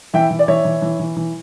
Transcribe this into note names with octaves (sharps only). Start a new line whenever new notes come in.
E3 E5 G5
E3
D5
E3 C#5 E5
E3
E3
E3
E3